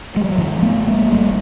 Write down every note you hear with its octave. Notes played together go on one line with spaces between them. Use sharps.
G#3
G3
F#3
G#2 D#3 F3
A3 B3
G#1
G#3 A#3
G#1 G3 A3